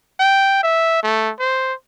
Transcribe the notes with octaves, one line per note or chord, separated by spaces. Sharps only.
G5
E5
A3
C5